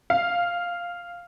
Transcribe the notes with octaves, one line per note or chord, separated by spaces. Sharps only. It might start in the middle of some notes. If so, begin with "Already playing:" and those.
F5